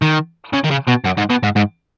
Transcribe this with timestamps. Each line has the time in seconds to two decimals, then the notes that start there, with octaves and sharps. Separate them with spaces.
0.02 D#3
0.53 C#3
0.64 D#3
0.70 C#3
0.87 B2
1.04 F#2
1.17 G#2
1.30 B2
1.43 G#2
1.56 G#2